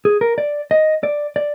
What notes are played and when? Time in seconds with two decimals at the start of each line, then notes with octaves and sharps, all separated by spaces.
0.05 G#4
0.21 A#4
0.38 D5
0.71 D#5
1.03 D5
1.36 D5